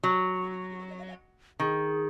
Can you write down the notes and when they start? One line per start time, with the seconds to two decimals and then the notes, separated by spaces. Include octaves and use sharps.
0.03 F#3
1.60 D#3 G#4